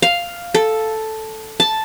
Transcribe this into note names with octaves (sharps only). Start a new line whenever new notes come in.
F5
A4
A5